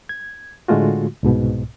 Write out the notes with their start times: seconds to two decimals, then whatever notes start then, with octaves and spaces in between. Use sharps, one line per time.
0.09 G#6
0.68 A2 D3 G#3 A3 F4 F#4
1.23 C2 G#2 B2